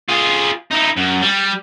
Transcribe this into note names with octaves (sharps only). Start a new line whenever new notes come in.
F4 G#4
D#4 E4
F#2
G3